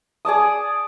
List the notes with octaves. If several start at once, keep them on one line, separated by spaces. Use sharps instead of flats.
G#4 D5 A5 D#6